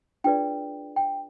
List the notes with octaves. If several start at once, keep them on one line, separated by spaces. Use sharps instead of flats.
D4 F4 G#4 B4 D5 G5
G5